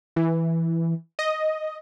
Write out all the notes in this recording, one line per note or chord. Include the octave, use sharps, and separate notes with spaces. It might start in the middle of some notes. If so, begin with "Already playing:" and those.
E3
D#5